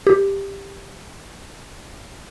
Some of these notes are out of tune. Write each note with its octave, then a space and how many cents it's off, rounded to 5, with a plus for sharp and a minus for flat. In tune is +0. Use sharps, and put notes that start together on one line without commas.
G4 +10